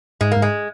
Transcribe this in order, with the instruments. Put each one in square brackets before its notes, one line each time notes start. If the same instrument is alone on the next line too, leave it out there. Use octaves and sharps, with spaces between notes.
[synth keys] G#2 [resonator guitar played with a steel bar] G#3
[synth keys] G#2 [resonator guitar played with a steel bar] A#3
[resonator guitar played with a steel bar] G#3